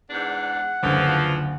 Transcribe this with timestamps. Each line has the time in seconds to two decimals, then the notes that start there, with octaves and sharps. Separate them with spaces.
0.10 E2 G#2 D4 F#5
0.83 F#1 D2 E3 F3